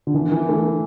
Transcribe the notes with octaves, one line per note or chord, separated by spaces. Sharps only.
D3
E3
E3
A3